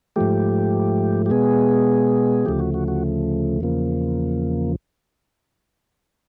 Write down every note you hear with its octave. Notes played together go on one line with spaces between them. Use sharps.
G#2 F3 A3 G4
G4
B2 G#3 B3 G#4
D2 C#3 F3 A3 G4
F#4
F#4
F#4
E2 C#3 F3 A#3